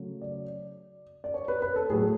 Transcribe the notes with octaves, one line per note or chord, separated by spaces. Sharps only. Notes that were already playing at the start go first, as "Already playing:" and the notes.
Already playing: C#3 F#3 A3
D5
D5
C#5
B4
B4
A4
A2 F#3 A3 G#4